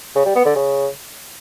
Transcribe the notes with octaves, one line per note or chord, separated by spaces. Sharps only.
C#3
G3
B3
D3
C#3